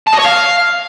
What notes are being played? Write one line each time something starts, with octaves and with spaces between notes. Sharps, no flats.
A5
D#5
C#5
F5